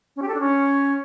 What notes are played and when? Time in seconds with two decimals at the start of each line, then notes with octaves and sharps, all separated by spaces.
0.16 C#4
0.22 G4
0.28 A4
0.34 D4
0.40 C#4